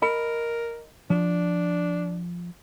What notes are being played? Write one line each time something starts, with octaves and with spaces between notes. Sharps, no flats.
A#4 D#5 B5
F3 D4